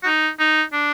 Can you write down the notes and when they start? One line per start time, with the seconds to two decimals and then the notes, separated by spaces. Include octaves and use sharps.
0.03 F#4
0.06 D#4
0.40 D#4
0.73 D4